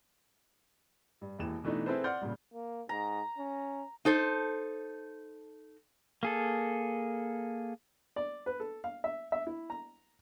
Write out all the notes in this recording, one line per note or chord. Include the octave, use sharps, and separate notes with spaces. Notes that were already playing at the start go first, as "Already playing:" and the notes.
G2
E1 D#2 E3 E7
B2 E3 A3 D4 D#4
C4 E4 G#4 A4 B4 C5
D5 F#5 C6 F6 G6
G2 A#2 C#3
A#3
G#2 A#5
C#4
D#4 A4 C5
A#3 G#4 A4
D5
B4
A4
F5
E5
E5
E4
A#5